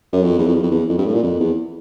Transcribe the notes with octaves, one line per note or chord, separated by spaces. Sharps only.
F#2
F2
E2
F2
E2
F2
E2
F2
G2
A2
A#2
F2
E2